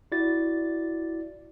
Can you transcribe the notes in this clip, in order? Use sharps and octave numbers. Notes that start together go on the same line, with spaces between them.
E4 F#4 D5 A6